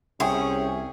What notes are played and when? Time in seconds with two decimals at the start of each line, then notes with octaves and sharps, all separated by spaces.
0.20 C2 C#4 G#4 E5 G5 C#6